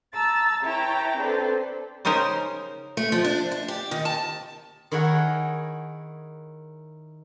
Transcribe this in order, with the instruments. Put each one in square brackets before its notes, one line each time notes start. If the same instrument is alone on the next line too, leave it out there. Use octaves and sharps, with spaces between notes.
[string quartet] A5 A#5 E6 A6
E4 B4 C#5 G5 A5 A#5
C4 D4 A4 B4 C5
[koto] C#3 C#4 D#4 A#4 C5
[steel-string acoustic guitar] A3
F3
D4
D4
G4
D#3
A5
[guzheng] D#3 E4 G#4 C#5 F#5 A#5